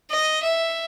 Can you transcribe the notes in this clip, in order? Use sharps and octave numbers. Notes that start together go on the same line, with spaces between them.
D#5
E5